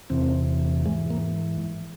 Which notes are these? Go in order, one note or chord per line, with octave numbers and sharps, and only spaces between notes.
E2 C3 E3 C4
G#2 E3 G#3
A#3